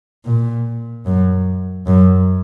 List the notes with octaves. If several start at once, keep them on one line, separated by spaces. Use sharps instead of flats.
A#2
F#2
F#2